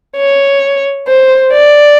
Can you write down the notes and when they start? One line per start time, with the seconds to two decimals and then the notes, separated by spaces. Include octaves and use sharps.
0.18 C#5
1.08 C5
1.52 D5